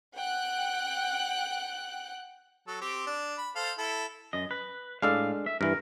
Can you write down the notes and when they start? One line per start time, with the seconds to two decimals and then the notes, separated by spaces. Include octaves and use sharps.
0.15 F#5 G5 F#6
2.67 F#3 A4
2.81 C4 G4
3.06 D4
3.38 B5
3.56 A4 C5 F5
3.78 E4 A4
4.33 F#2 D#5
4.51 B4
5.02 A2 G#3 D4 A4 F5
5.46 E5
5.61 G2 E3 A#4